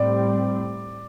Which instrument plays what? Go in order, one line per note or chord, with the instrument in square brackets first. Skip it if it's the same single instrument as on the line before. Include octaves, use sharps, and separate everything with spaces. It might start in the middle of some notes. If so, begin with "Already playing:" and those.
Already playing: [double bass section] A2 G3 C4 [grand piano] D5